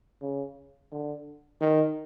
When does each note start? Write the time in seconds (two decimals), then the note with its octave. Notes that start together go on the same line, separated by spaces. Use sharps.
0.22 C#3
0.92 D3
1.61 D#3